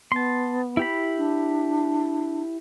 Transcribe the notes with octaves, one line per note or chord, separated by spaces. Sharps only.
B3 A5 C6
E4 G4 B5
D4